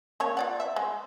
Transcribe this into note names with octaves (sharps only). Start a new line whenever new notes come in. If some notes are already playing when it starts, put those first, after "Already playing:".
C#3 A#3 C#5
F4 D5 F#5
E5
G#3